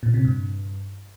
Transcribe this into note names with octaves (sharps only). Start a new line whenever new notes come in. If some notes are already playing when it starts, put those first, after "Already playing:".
A#2
C3
G2